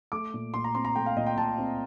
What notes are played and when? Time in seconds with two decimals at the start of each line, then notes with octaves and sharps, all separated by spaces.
0.12 A3 D6
0.34 A#2
0.54 A#2 C6
0.64 A#5
0.74 C4 C6
0.85 A#5
0.95 A3 G5
1.06 F5
1.17 A#2 D#5
1.26 G5
1.37 A#2 A5
1.58 C4